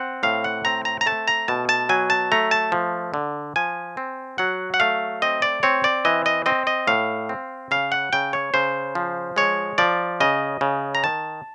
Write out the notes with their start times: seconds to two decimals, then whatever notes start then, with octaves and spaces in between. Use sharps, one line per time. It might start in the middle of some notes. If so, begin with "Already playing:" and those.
Already playing: C4 F#5
0.23 A2 F5
0.44 F#5
0.65 C4 A#5
0.85 A#5
1.01 A#5
1.06 A3 A5
1.28 A#5
1.48 B2 A5
1.69 A5
1.89 F#3 G#5
2.10 A5
2.32 A3 A#5
2.51 A5
2.72 F3
3.14 D3
3.56 F3 G#5
3.97 C4
4.38 F#3 F#5
4.74 F#5
4.80 A3 F5
5.22 C4 D#5
5.42 D5
5.63 C4 C#5
5.84 D5
6.05 E3 D#5
6.26 D#5
6.46 C4 D#5
6.67 D#5
6.87 A2 F5
7.29 C4
7.71 C#3 F5
7.92 F#5
8.13 C#3 G5
8.33 C#5
8.54 C#3 C5
8.95 F3
9.36 G#3 C#5
9.78 F3 D5
10.20 C#3 D#5
10.61 C#3
10.95 A#5
11.04 D#3 A5